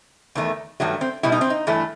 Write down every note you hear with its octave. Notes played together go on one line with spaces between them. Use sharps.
E2 D#3 A3
G2 D#3 F#3 A3
C4
B2 G3 E4
D#4
C4
D#4
G2 E3 A3